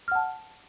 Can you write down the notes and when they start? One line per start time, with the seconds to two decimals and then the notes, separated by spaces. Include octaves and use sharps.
0.08 F6
0.12 F#5
0.15 A5